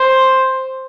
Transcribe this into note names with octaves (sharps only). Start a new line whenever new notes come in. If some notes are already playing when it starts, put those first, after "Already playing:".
Already playing: C5